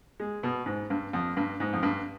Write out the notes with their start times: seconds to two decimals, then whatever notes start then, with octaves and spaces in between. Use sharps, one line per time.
0.20 G#3
0.43 B2
0.66 G#2
0.90 G2
1.13 F2
1.37 G2
1.60 G#2
1.73 F2
1.83 G2